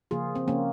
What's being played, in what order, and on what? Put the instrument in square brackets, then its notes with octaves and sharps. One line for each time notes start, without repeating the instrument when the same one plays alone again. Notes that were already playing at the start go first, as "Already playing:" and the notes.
[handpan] C#3 F3 A#3 F4 G#4
C4
C#3 F3 A#3 C#4